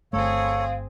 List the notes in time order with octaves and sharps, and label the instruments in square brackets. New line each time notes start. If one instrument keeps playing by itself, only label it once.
[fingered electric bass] G1 A3 [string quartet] C4 G#4 [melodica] A4 C#5 [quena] F5